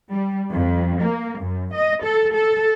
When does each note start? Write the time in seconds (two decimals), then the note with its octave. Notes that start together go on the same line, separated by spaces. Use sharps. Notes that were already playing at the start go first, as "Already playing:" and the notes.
0.11 G3
0.53 F2
1.03 A#3
1.41 F#2
1.74 D#5
2.05 A4
2.34 A4